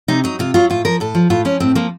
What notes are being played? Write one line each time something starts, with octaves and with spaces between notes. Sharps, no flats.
C3 D#4
F#3 D#4
C3 F4
F#3 F4
A2 F4
F3 A#4
A2 A4
F3
A2 F4
F3 C#4
A2 C4
F3 A#3